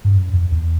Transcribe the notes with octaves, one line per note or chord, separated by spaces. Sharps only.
G2
F#2
F2
E2